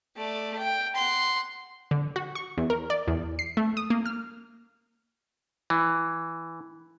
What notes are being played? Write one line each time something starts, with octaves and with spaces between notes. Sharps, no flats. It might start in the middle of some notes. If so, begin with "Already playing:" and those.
A3 D5
G5
F#5 C6
D3
F#4
C#6
E2
A#4
D5
E2
C7
A3
D#6
A#3
F6
E3